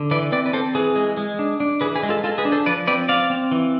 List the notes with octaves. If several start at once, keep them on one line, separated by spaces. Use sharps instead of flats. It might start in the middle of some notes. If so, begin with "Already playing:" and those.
Already playing: D3
E3 B4 D5
C4 B4 D5
B4
C4 A4 C5
E3 G#4 B4
G#3
G#3
D4
D4
E3 G#4 B4
G#4 B4
G#3
F4 A4
G#3 F4 A4
G#4 B4
D4
A4 C5
F3 B4 D5
C4 B4 D5
C4 D5 F5
C4
E3